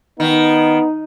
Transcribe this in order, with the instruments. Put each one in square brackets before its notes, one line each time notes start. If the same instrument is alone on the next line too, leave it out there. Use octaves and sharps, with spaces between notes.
[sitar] D#3 [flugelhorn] B3 [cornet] D#4